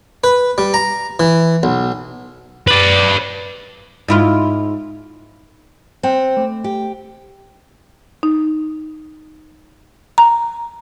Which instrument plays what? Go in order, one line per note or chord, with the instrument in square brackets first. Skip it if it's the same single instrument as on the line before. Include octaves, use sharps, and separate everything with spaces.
[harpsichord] B4
G3
A#5
E3
B1
[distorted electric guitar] B4 D5
[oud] G#2 E4 F4
[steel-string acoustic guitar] C4 [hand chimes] C5 G5
[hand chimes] A3
[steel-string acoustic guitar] G4
[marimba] D#4
A#5